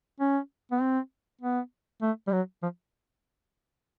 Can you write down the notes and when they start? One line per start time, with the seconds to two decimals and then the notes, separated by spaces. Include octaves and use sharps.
0.20 C#4
0.72 B3
0.81 C4
1.42 B3
2.02 A3
2.27 G3
2.32 F#3
2.63 F3